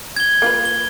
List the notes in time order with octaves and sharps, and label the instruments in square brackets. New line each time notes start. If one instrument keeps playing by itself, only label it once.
[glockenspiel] G#6 G7
[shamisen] A#3 F4 B4
[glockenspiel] G7